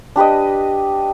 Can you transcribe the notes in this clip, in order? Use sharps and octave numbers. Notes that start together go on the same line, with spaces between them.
D4 G4 B4 D#5